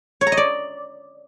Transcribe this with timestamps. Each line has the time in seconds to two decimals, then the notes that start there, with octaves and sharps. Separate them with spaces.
0.21 C#5
0.27 A#5
0.32 D#5
0.37 D5